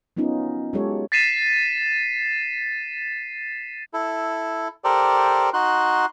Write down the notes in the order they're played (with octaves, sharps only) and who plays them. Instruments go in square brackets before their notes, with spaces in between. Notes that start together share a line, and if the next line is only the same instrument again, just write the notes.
[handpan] F#3 B3 C#4 D#4 F4
F#3 G#3 F4 G4 A4 C#5
[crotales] A6 B6 C7 D#7 E7
[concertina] E4 A4
G4 A4 A#4 C5 D5
D#4 F#4 C6 F#6